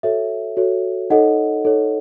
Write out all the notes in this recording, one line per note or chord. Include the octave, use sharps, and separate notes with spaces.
F#4 A4 C#5 E5
F#4 A4 C#5
D#4 A4 C#5 D#5 F#5
D#4 A4 C#5